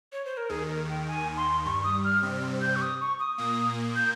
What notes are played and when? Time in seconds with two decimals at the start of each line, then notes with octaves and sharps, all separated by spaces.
0.13 C#5
0.25 C5
0.37 A#4
0.49 D#2 D#3 G#4
0.69 A#4
0.89 G5
1.07 G#5
1.37 C6
1.65 G2 G3 C#6
1.84 D#6
2.04 F6
2.23 C3 C4
2.61 G6
2.76 C#6
2.81 D#6
3.01 C#6
3.19 D#6
3.38 A#2 A#3
3.96 G6